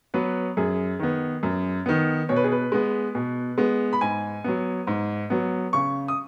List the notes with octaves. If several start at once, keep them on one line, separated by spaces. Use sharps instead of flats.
F#3 B3 B4
F#2 G#4
D#3 B3
F#2
D#3 B3
B2 C#5
B4
G#4
B4
G#3 B3
B2
G#3 B3
B5
G#2 G#5
F#3 B3
G#2
F#3 B3
C#3 C#6
D#6